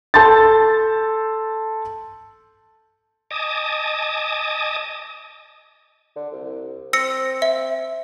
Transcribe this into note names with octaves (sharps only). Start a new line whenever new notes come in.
A4 A5 C6 G6 A6
D#5 G#5 A5 D6 D#6
D3
C2
C4 E6 A#6 C#7
E5